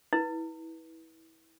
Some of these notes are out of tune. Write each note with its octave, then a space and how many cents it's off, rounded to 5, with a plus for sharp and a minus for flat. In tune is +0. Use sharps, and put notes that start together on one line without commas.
E4 -25 B4 -20